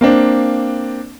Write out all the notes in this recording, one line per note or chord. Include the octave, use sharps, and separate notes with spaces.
A#3 C4 D4